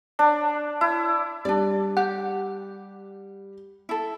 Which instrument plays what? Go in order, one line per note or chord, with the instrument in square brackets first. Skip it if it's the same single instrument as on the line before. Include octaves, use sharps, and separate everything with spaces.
[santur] D4
E4
[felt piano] G3 [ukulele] D4 D5
[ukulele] G4 [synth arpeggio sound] F#5
[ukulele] E4 A4